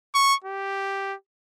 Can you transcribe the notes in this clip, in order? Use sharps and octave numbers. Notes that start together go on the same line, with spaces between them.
C#6
G4